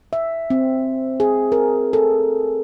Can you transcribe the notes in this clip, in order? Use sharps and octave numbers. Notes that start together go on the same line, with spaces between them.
E5
C4
G#4
A#4
A4